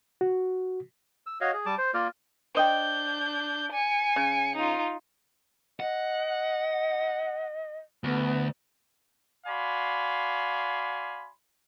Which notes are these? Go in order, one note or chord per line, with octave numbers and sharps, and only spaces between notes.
F#4
E6
F#4 C#5 D#5 F5
G#4
G3 A5 D6
C5
A#3 F4 A#4 D5
D4 C5 D#5 G5 G6
G#5 C#7
C#3
D#4 F4
D#5 F#5
D2 B3
F#4 D5 F5 G#5 B5 C6